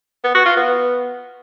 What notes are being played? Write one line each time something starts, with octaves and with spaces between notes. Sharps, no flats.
B3
F#4
F4
B3